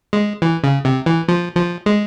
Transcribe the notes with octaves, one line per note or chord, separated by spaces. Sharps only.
G#3
E3
C#3
C3
E3
F3
F3
G#3